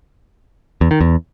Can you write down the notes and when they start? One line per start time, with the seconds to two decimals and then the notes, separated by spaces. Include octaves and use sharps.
0.81 E2
0.91 D#3
1.01 E2